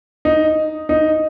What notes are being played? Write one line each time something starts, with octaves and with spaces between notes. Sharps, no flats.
D#4
D#4